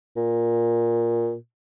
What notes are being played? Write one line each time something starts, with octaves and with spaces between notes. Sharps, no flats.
A#2